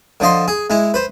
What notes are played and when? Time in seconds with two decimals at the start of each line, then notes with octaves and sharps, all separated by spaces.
0.20 D3 F3 D#5 C6
0.48 G#4
0.70 G#3 E4
0.94 B4 C5